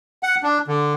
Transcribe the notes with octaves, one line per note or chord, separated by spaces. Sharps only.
F#5
D4
D3